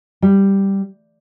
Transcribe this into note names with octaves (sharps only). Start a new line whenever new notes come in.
G3